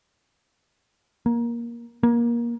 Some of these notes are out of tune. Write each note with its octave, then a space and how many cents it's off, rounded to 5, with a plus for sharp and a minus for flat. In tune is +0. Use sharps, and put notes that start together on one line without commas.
A#3 +15
A#3 +20